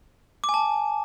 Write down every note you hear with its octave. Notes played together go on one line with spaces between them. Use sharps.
D6
G#5
A5